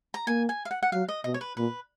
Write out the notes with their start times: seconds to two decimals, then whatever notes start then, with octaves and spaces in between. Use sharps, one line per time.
0.14 A#5
0.27 A#3 G#5
0.49 G#5
0.65 F5
0.71 F#5
0.83 F#5
0.92 F#3 F5
1.08 D#5
1.24 B2 D#5
1.34 C#5
1.41 B4
1.57 A#2 B4